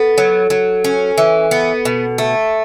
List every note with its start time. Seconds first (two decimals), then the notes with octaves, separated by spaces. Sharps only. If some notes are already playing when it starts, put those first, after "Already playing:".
Already playing: B3 A4
0.18 F#3
0.50 F#3
0.84 C#4
1.18 E3
1.51 B3
1.85 B2
2.18 A3